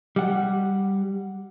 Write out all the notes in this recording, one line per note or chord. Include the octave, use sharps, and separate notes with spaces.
G3 F#5